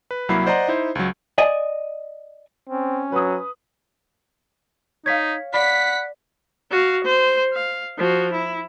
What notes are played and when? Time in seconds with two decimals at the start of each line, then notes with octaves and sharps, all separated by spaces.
0.11 B4
0.29 C2 F#3 A#3 E4 B5 C7
0.47 C5 D5 D#5 F#5 A#5 C6
0.68 D#4 E4 C5
0.95 C#2 F#3
1.38 D5 D#5 G#5
2.69 C4 C#4
3.12 F#3 B4 D#6
5.06 D#4 C#5 F5 G#6 B6
5.54 D5 F#5 B5 B6
6.71 F#4 F5
7.04 C5
7.53 F5
7.98 F3 F#4
8.32 E4